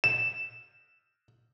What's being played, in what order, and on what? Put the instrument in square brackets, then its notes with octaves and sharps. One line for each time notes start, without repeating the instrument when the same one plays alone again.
[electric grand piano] E7